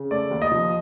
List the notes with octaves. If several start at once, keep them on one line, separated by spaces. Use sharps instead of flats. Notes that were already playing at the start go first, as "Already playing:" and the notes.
Already playing: C#3
A3 D5
D#2
D#5
F3